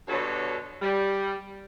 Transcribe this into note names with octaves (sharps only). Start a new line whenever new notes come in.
G2 B2 D3 F#3 A4 C#5
G3